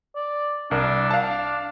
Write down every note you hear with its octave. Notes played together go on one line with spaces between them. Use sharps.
D5
C2 D4 A#4
D4 F5 A5